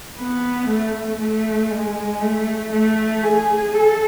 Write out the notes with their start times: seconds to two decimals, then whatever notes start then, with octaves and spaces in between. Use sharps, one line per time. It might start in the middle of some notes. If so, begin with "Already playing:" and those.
0.17 B3
0.68 A3
1.19 A3
1.70 G#3
2.21 A3
2.72 A3
3.23 G#4
3.74 A4